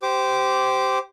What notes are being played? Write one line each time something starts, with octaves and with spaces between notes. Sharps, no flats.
G4 C5 D6